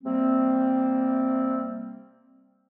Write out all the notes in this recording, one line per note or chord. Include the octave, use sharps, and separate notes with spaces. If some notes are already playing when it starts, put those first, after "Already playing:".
C3 G3 A#3 C4